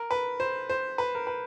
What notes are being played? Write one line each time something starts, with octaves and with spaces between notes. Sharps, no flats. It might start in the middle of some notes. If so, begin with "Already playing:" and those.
Already playing: A#4
B4
C5
C5
B4
A#4
B4